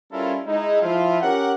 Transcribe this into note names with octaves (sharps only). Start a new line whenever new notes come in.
G3 C#4 E4 F4 A4 A#4
G#3 D#4 E4
F3 E4 F4
C#4 G4 A#4 F#5